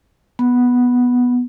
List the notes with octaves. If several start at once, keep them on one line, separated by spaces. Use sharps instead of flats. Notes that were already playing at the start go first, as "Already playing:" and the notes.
B3